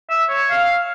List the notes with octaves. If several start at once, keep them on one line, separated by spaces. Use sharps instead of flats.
E5
C#5
F5